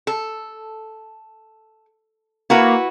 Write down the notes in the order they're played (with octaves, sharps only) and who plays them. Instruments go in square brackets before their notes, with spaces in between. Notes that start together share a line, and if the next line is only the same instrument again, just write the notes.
[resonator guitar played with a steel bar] A4
[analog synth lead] A#3 [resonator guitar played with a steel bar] E4 F#4 B4